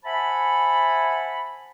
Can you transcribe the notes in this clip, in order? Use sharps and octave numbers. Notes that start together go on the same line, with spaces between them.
C5 E5 F#5 G#5 A5 B5